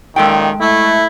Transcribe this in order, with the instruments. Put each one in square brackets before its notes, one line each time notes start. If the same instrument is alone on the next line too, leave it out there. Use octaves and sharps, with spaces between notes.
[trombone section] F#2 A#2 D#3 [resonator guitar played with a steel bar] G#3 A4 G5
[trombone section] A3 [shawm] E4